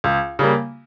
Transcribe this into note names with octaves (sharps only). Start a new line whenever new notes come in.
C#2
C#3 G3 A#3